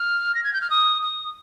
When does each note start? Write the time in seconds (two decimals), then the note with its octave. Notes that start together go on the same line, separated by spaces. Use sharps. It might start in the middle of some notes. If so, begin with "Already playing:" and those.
Already playing: F6
0.35 A#6
0.44 G#6
0.53 G6
0.61 F6
0.70 D#6
1.02 D#6